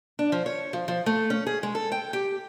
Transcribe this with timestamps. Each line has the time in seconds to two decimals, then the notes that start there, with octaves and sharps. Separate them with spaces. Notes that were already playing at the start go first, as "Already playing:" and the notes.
0.19 D4
0.32 F3
0.46 C#5
0.73 F3
0.88 F3
1.06 A3
1.30 C#4
1.47 G#4
1.63 G#3
1.75 A4
1.92 G5
2.13 G4